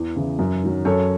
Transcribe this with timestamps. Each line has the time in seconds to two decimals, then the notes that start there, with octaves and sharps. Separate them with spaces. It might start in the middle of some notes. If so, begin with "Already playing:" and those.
Already playing: E2
0.16 C#3 E3
0.39 F#2
0.63 D#3 F#3
0.85 F#2 A4 C#5